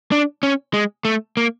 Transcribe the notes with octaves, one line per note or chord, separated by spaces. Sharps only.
D4
C#4
G#3
A3
A#3